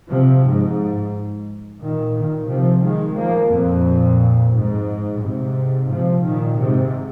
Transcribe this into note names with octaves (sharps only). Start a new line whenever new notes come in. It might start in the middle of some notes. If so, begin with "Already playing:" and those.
C3 F3
G#2
A#2 D#3
A#2 D#3
C3 F3
D#3 G#3
F3 A#3
F2 A#2
G#2
G#2 C3
C3 F3
A#2 D#3
G#2 C3